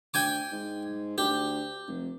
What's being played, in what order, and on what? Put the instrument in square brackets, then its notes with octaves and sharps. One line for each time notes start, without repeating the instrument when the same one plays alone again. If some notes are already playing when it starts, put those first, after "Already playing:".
[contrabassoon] D2 [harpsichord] G5 G#5 D6
[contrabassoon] G#2
[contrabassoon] D2 [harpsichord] G4
[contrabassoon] F1